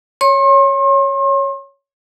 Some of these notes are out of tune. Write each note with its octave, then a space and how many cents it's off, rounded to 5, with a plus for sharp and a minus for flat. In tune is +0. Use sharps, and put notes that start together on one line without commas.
C#5 +0 C6 +40